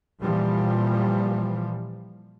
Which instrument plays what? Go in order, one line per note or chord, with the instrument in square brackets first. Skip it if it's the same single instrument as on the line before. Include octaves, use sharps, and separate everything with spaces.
[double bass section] A#2 E3 F3 G3